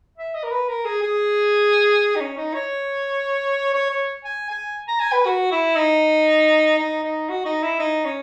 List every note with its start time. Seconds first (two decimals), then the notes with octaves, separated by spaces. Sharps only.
0.18 E5
0.34 D#5
0.44 A#4
0.51 B4
0.69 A#4
0.85 G#4
1.03 G#4
2.16 D#4
2.21 C#4
2.37 D#4
2.54 C#5
3.74 C#5
3.90 C#5
4.24 G#5
4.50 G#5
4.88 A#5
5.00 G#5
5.12 B4
5.26 F#4
5.51 E4
5.76 D#4
6.79 D#4
7.03 D#4
7.29 F#4
7.45 D#4
7.63 E4
7.79 D#4
8.05 C#4